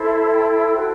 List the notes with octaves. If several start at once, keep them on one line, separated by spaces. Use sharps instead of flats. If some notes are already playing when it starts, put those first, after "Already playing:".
Already playing: E4 A4 C5
E5
G5
F#4 A4 C5